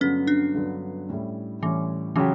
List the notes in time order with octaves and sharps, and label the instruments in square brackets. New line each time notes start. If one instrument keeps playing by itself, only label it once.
[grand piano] G2 D3 F#3 B3 [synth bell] C#4
[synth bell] D4
[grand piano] G2 D3 F#3 B3
A2 G3 C#4
[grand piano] A2 G3 C#4 [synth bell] E3
[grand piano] C#3 F#3 C#4 G4 [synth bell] E3